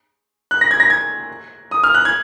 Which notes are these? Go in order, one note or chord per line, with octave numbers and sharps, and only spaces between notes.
F#6
A#6
G#6
A#6
G#6
D#6
F6
F#6
G#6